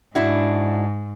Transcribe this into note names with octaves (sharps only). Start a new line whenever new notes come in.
G#2 D4 E4 F#4